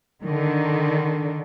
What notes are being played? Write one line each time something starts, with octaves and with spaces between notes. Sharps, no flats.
D3 D#3